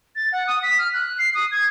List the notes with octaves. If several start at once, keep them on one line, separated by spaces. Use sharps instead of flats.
A6
F#5
D#6
B6
F6
F#6
C7
D#6
G#6